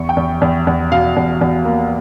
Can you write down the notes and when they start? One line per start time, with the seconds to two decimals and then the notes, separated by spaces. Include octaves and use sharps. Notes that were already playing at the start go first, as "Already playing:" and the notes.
Already playing: E2 C#6
0.09 G5
0.17 E2
0.41 E2
0.67 E2
0.92 B2 F5
1.16 E2
1.41 E2
1.65 A#3